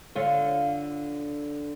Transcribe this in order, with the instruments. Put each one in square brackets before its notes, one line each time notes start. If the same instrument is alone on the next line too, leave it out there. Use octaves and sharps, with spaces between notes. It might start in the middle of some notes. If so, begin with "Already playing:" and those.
[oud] D3 F4 C#5